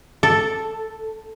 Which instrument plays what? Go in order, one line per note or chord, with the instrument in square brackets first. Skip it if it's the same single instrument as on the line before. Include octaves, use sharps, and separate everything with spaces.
[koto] A4